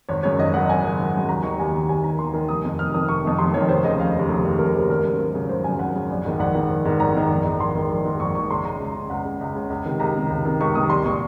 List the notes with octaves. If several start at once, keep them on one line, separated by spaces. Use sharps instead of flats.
G#1 C#5
F#2 C#3 C#5
G#1 D#5
F#2 C#3 F#5
G#1 G#5
F#2 C#3
G#1
F#2 C#3
D#2 A#5
D#3 C#6
D#2 G#5
D#3
D#2 G#5
D#3 A#5
D#2 C6
D#3
F1 D#6
F2 D#3
F1 F6
F2 D#3 D#6
F1 C#6
F2 D#3
F1 C6
F2 D#3 C#5
F1 C5
D#2 C#3 D#5
F1 F5
D#2 C#3
F1
D#2 C#3
F1 A#4
D#2 C#3
G#1 A#4
F#2 C#3
G#1
F#2 C#3
G#1 C5
F#2 C#3 G#5
G#1 F#5
F#2 C#3
A#1
G#2 D#3
A#1 F#5
G#2 D#3
A#1
G#2 D#3
A#1 A#5
G#2 D#3
A#1
G#2 D#3
A#1 C6
G#2 D#3
A#1
G#2 D#3
A#1 C#6
G#2 D#3 C#6
C#2 C6
C#3 A#5
C#2
C#3
C#2 F#5
C#3
C#2
C#3
C#2
C3 D#3
C#2 A#5
C3 D#3
C#2
C3 D#3
C#2 C#6
C3 D#3 D#6
C2 C6
A#2 C#6